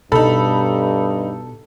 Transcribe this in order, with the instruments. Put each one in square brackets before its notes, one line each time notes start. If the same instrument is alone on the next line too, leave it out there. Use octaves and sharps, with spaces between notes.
[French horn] G2 [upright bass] B2 [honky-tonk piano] D#4 B5 [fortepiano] A4